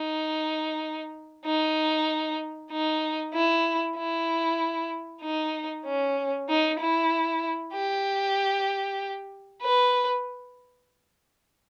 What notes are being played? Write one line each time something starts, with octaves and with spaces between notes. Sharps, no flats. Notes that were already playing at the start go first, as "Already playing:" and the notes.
Already playing: D#4
D#4
D#4
E4
E4
D#4
C#4
D#4
E4
G4
B4